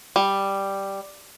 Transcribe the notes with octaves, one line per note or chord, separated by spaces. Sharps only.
G3